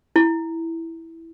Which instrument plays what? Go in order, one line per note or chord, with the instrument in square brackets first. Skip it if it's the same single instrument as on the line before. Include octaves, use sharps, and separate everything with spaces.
[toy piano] E4